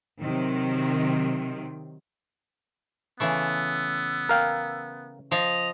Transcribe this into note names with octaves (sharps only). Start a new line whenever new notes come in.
C3 D#3 F#3 C4
C#3 E3 A3 B3 E6
A#4 F5 G5
F3 D#5 F7